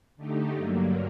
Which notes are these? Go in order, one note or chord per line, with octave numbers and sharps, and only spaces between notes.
D3 A3 D#4 G4
G2 D3 F#3 A#3